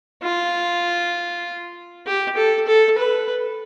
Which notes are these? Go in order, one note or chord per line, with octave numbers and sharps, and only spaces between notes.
F4
G4
A4
A4
B4